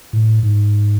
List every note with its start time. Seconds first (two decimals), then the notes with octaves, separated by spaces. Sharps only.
0.13 A2
0.43 G#2